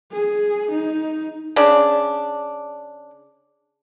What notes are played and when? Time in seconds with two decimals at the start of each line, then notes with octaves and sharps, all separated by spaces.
0.12 G#4
0.71 D#4
1.56 C#3 D4